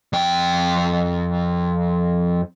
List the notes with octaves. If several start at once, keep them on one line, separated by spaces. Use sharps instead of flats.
F2 G5